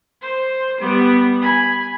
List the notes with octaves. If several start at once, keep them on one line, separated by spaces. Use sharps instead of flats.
C5
G3 B3
G#5 B5